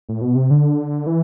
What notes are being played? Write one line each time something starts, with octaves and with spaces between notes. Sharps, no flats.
A2
B2
C3
D3
E3